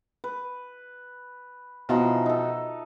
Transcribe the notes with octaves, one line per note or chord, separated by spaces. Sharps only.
B4
B2 E3 F3 D#4
D#4 A4